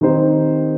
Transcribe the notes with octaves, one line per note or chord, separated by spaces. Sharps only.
D#3 C4 D#4 G4 C5